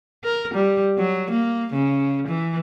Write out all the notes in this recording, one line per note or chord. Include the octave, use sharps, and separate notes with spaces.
A#4
G3
F#3
A#3
C#3
E3